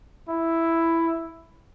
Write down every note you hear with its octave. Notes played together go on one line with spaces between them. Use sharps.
E4